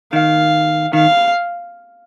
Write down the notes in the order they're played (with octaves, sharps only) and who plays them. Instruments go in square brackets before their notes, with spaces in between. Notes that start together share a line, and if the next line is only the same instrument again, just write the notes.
[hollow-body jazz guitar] D#3 [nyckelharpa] F5
[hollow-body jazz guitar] D#3 [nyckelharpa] F5